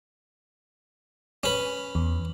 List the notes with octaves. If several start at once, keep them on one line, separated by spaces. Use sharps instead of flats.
C#4 B4
E2